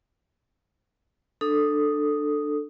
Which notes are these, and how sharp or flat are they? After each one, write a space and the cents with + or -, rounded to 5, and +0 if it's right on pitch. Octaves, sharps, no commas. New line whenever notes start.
D4 +20 A4 +5 D#6 +0